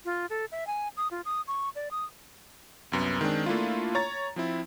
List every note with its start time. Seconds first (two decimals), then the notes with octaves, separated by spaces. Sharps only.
0.05 F4
0.30 A4
0.52 E5
0.67 G#5
0.97 D#6
1.11 F4
1.25 D#6
1.47 C#6
1.75 D5
1.91 D#6
2.92 C2 F#2 B3
3.21 D#3 G#3 C4 D4
3.46 A3 A#3 D4 E4 F4
3.95 C#5 A#5 A6
4.36 F3 C4 E4